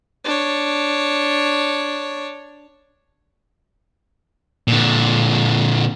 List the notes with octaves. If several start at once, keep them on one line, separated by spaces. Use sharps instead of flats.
D4 C#5
A#2 D3